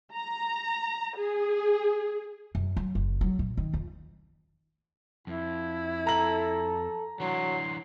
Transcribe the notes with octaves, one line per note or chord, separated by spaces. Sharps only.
A#5
G#4
F#2
F#3
F#1
F#3
A#1
D#3
F2
F2 E4
A4 A#5 F#7
E3 F#3 D4 C6